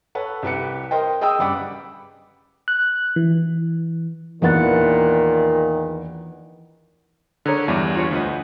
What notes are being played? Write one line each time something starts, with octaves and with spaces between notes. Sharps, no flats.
A4 B4 C#5 F#5
C2 G4 B4 C#7
A#4 C5 D#5 G5
G#4 D#5 G5 D#6 E6
G1 C#3 G3 F#5 B5 D6
F#6
E3
A#1 E2 A#2 D#3 E3 B4 F#5 A6
D3 G#4 A#4 C#5
E2 G2 D4 E5 G#5
F4 C#5
D2 F4 B4 D#5